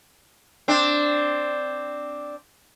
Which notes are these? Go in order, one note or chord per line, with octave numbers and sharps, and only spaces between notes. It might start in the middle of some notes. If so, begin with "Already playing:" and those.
C4 D4